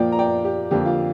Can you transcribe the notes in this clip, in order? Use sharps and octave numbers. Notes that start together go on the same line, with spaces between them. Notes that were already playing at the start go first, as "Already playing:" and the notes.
Already playing: A#2 F3 A#3 D5 G5
A#5
D5 G5
G4
F2 D3 A#3 G4
F4